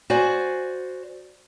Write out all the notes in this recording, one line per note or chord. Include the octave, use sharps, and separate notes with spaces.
F#4 C5 D5 G#5